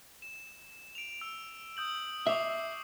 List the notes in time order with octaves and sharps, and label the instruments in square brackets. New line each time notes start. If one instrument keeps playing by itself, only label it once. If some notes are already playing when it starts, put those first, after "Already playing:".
[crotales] E7
D7 F7
E6
D#6 G6 F#7
[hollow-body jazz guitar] E5 [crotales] C#6 D6 C7